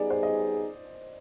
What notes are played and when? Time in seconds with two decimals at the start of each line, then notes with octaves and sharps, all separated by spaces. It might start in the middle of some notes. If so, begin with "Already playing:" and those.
Already playing: G3 B3 D#4 G#4 D5
0.10 C5
0.23 D#5